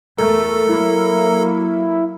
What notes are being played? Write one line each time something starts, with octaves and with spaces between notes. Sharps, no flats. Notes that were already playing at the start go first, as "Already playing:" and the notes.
E2 A3 A4 A#4
F#3 A#3 E4